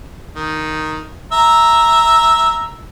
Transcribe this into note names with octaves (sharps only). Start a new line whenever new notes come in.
D#3
E5 A#5